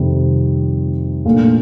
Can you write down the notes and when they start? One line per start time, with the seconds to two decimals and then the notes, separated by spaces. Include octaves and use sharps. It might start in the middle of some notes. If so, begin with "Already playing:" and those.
Already playing: F2 C3 D#3 G3
1.25 A#2 A3 D4 F4